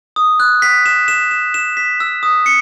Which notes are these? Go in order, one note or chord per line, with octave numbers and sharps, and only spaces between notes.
D#6
F#6
B6
E7
E7
E7
E7
B6
E6
D#6
C#7